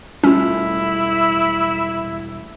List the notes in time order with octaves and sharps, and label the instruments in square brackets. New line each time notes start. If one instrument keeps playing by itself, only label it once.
[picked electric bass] E1 G3 A3 [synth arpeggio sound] C#4 F4 [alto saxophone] E4